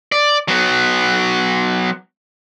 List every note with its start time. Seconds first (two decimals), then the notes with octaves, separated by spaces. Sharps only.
0.12 D5
0.48 F#3 B3